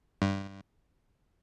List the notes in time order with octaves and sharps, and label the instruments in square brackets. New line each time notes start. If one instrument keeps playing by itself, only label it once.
[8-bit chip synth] G2